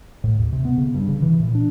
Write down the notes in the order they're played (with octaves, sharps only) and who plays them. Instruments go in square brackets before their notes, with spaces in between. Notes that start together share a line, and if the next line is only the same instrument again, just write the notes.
[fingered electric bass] A2
D#2
C3
B3
C#3
G2
C#3
E3
A#2
D4